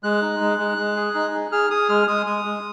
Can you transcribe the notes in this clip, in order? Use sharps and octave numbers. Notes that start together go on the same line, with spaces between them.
G#3 F#6
D#4
G#3
G#3
G#3
G#4
D#4
G#4
G#4 F6
G#4 D#6
G#3 F6
G#3 D#6
G#3 D#6
G#3